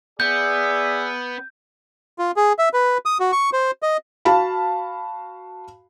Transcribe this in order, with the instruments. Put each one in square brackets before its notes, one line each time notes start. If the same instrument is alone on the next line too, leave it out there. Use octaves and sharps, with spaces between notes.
[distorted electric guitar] B3 [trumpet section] G#4 D5 E5 [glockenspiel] G6
[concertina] F4
G#4
E5
B4
D#6
F#4
C#6
C5
D#5
[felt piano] F#4 F5 A5 B5